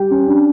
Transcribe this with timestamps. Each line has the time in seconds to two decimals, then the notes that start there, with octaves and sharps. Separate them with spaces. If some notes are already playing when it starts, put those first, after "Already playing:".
Already playing: G3 G5
0.11 C#4
0.28 D4